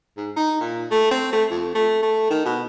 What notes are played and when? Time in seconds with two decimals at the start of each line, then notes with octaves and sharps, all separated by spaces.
0.17 G#2
0.36 D#4
0.60 A#2
0.91 A3
1.11 C4
1.32 A3
1.51 F2
1.75 A3
2.02 A3
2.30 D#3
2.45 B2